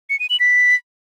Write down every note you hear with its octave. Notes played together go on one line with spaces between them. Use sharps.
C#7
D#7
F#7
B6